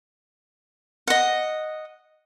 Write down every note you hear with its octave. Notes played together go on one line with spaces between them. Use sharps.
D#5 F#5